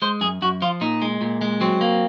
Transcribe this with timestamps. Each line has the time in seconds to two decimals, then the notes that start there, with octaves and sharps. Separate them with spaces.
0.02 G#3 C5
0.21 F#2 G#4
0.42 F#2 F#4
0.62 F3 F4
0.81 A#2 D#4
1.02 G#3
1.21 A#2
1.41 G#3
1.61 F#3 C4
1.81 A#3